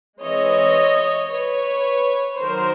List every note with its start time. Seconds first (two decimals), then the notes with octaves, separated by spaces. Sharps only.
0.21 E3 G#3 C4 E4 C#5 D#5
1.31 B4 C#5
2.41 D#3 F#3 A#4 C5